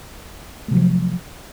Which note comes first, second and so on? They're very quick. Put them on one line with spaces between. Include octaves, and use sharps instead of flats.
A3 C3 F#3 F3